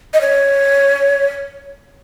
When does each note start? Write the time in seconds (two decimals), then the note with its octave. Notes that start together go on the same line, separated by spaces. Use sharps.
0.14 D#5
0.21 C#5